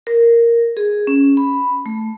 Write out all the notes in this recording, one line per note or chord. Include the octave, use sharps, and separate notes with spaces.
A#4
G#4
C#4
B5
A3